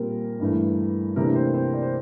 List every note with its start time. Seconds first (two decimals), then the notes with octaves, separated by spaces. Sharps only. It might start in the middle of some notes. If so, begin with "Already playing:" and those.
Already playing: A#2 G3 A#3 C4 A#4
0.40 G2 E3 A3
1.16 C3 E3 A3 A#3 D4 A#4
1.35 C4 C5
1.54 C4 C5
1.74 D5
1.82 C5